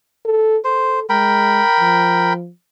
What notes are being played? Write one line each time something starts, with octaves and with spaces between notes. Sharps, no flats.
A4
A4 C5
G#3 A#4 G5 B5
F3